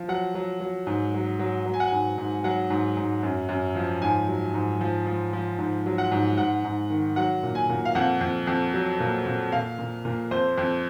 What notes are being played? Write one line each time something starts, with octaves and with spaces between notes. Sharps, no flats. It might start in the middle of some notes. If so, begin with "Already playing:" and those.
Already playing: F3
F#3 F#5
F#3
F#3
G#2
F#3
F#3
F#3
G#5
F#5
G#2 G#5
G#2
F#3 F#5
G#2
G#2
F#2
F#2
F3
G#2 G#5
F#3
G#2
F3
F3
F3
G#2
F#3
F#5
G#2
G#2 F#5
G#2
D#3
F#3 F#5
A#2
G#5
A#2
F5
F2 F#5
F2
F2
F#3
A#2
A#2
A#2 F5
A#2
A#2
F2 C5
F2